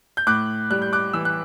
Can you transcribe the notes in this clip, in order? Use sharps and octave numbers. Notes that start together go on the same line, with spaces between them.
G6
A2 D6 F#6
G3 F#6
G6
D6 F#6
E3 E6
F#6